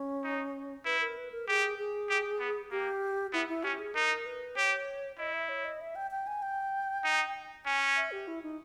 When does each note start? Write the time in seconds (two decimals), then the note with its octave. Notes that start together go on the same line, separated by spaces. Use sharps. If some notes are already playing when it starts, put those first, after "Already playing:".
Already playing: C#4
0.24 D#4
0.85 E4 B4
1.01 A#4
1.17 B4
1.32 A#4
1.48 G4 G#4
1.78 G#4
2.10 G4
2.40 B3
2.71 A#3 G4
3.33 B3 E4
3.49 E4
3.64 C#4 G4
3.79 G#4
3.95 D#4 A#4
4.26 B4
4.56 G4 C#5
5.18 E4 D#5
5.33 E5
5.49 C#5
5.65 D#5
5.81 E5
5.96 G5
6.11 G5
6.27 G#5
6.42 G5
7.04 D#4
7.65 C#4 G#5
7.96 E5
8.12 G4
8.28 E4
8.43 D#4